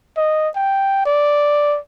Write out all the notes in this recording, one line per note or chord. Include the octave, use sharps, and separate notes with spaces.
D#5
G5
D5